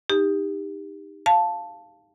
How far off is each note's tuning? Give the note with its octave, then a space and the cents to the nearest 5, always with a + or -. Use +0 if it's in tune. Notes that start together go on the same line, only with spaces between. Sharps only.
D#4 +0 G4 +25
F5 +0 A5 +0